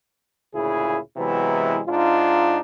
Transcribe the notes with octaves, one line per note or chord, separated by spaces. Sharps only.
D2 A#2 C#3 E4 G#4
C3 E3 F#3 G#3 B3 E4
G#2 D4 D#4 F4